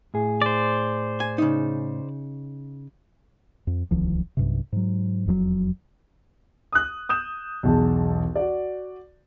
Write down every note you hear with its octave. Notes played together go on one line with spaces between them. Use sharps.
A2 G#4
C5 D5
G#5
C#3 D#4
F2
D1 C2 D#3 F3
B1 G2 C3
G#2 F#3
E1 F2 C3 F#3
D#6 F#6
D#6 G6 E7
B1 E2 G#4 A5
F#4 D5